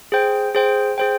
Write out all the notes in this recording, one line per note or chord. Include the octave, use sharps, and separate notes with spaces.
G#4 C5 G5
G#4 C5 G5
G#4 C5 G5